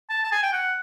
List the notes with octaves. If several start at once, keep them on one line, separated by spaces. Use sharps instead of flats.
A5
A5
G#5
G5
F#5